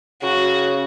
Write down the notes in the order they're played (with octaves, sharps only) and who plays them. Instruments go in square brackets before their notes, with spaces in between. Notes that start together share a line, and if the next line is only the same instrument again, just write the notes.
[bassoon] C#3 [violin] F#4